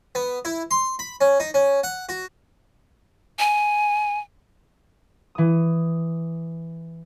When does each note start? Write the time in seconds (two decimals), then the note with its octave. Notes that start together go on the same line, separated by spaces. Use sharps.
0.15 B3
0.45 E4
0.71 C6
0.99 B5
1.21 C#4
1.40 D#4
1.54 C#4
1.83 F#5
2.09 F#4
3.39 G#5
5.35 E3 D#6